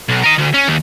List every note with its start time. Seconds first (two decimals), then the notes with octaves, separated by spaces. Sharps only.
0.09 B1
0.24 A#4 D#5
0.39 D2
0.54 C#4
0.68 D#2